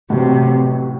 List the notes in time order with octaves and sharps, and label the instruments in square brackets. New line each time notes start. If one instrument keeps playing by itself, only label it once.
[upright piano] A1 A2 F#3 [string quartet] C3